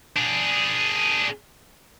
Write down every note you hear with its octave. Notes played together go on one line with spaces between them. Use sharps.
D4 G#4